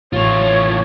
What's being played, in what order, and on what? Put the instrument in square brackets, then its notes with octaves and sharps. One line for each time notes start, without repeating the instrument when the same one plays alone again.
[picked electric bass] A1 [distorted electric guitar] A2 F4 [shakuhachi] C#5